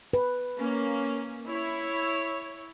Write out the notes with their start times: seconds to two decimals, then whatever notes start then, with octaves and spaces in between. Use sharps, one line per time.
0.13 B4
0.57 A#3 C#4
1.47 E4 C#5